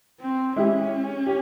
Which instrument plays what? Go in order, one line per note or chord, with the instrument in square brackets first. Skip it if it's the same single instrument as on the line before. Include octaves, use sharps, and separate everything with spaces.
[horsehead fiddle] C4
[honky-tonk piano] G#3 E4 G4 [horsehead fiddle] C#4
[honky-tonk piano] G4